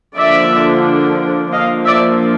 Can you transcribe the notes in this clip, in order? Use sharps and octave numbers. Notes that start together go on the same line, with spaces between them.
D3 F3 A#3 D4 D5 E5
F3 A#3 D4 D#5 F5
D5 E5